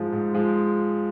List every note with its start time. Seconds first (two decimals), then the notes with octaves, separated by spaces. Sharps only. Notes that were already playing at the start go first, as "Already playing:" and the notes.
Already playing: G#2 F3 G#3
0.13 G#2
0.34 F3 G#3